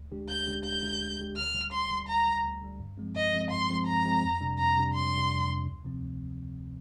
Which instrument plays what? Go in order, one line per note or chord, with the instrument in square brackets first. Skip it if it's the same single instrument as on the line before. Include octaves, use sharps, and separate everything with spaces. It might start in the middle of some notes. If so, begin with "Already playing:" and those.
Already playing: [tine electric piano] D2
D3 G#3 D4 G4
[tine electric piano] D2 [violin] G6
[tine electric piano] D3 G#3 D4 G4
[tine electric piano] D2 [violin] G6
[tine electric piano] D3 G#3 D4 G4
D2
D3 G#3 D4 G4
[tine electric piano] D2 [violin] F6
[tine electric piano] D3 G3
[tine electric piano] D2 [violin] C6
[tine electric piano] D3 G3
[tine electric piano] D2 [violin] A#5
[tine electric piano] D3 G3
D2
D3 G3
G2
F3 G#3 C4
[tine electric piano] G2 [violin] D#5
[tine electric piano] F3 G#3 C4
[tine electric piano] G2 [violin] C6
[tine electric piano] F3 G#3 C4
[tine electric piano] G2 [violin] A#5
[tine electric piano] F3 G#3 C4
F2
C3 G3 D4
[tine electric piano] F2 [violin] A#5
[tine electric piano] C3 G3 D4
[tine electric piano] F2 [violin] C6
[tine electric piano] C3 G3 D4
F2
C3 G3 D4
D2
C3 F3 C4
D2